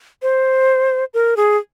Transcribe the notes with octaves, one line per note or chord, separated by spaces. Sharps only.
C5
A#4
G#4